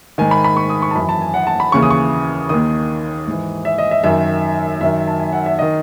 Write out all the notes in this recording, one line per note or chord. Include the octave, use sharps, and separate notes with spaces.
G#2 D#3 G#5
B5
B5
C#6
D#6
C#6
A5
F#2 E3 B5
A5
G#5
F#5
A5
B5
D#2 C#3 E3 C#6
D#6
C#6
D#2 D#3 D#6
G#2 E3
E5
D#5
E5
F#2 D#3 E5
F#2 D#3 E5
A5
G#5
F#5
E5
D#3 D#5